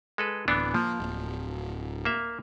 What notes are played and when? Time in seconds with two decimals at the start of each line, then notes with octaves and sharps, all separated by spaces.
0.18 G#3 A4 B4
0.48 D1 E3 B3 D4
0.74 F3 A#3
1.00 D1
2.05 A#3 E5